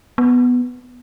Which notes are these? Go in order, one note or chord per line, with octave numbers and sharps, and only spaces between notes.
B3